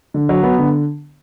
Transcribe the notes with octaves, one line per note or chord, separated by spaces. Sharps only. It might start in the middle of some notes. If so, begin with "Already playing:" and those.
D3
F#3
B3
D3